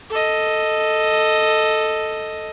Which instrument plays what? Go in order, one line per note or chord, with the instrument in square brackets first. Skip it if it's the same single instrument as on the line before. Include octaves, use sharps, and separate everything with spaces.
[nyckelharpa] A4 D#5